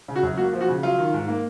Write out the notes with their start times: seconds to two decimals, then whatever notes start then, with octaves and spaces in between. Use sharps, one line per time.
0.08 C#3
0.16 F#4
0.23 F#2
0.37 A#3 F#4
0.53 F3
0.61 F#4
0.68 C#3
0.83 F#3 F4
0.98 D#3
1.14 G#2
1.28 A#3